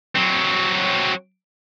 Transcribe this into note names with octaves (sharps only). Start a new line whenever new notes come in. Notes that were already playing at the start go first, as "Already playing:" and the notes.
F#3 C4